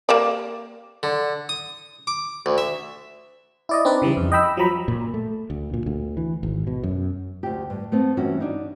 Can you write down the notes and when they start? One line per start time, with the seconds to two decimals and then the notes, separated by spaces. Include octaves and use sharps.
0.09 A#3 G4 D5
1.03 D3
1.49 D#6
2.07 D6
2.46 D2
2.58 E5
3.69 E4 D5 D#5
3.85 C4 D4 D#4 B4 D5
4.02 C#3 E3 G3
4.17 F2
4.32 D#5 G5 B5 E6
4.57 F3 F#3 A#5 B5
4.88 A#2
5.14 A3
5.50 D2
5.74 A#2
5.86 D2
6.17 E3
6.43 G#1
6.67 B2
6.83 F#2
7.43 D2 G4
7.70 G2
7.92 A3 B3 C4
8.17 G2 E3 C#4 F#4
8.40 D4 D#4